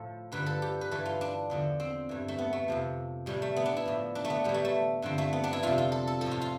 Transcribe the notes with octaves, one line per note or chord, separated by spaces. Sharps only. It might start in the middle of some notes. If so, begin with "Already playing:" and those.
Already playing: A2 F3 A4
G2 D3 F3 B4
A4
G4
B4
G2 E3 A4
F4
D4
E2 D3 F3
C4
G2 E3
A3
B3
A3
F2 C3 F3
A2 E3 G3
A3
B3
D4
E4
A2 F3
D4
A3
B3
A2 E3 G3
A3
A3
G2 D3 F3 C4
A3
B3
D4
E4
F2 C3 F3 F4
F4
A4
A4
F3 A4
A2
F4
F4